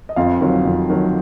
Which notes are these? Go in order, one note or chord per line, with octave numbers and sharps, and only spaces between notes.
D#5
F2 F4 F5
D#3 F#3
F2
D#3 F#3